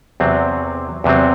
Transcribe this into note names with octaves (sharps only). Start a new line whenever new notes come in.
E2 C3 F#3 C4
E2 C3 F#3 C4